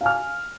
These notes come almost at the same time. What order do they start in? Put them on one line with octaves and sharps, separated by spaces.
F5 G#5 F6